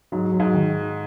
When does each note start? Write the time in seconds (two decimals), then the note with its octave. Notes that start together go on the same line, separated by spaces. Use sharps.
0.12 G#2 F#3
0.33 F#3
0.40 G#2
0.54 D#3